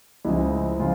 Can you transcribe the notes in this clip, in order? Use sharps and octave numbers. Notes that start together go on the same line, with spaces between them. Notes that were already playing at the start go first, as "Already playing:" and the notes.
C#2 C#3 F3 G#3 E4
C#3 F3 G#3 F4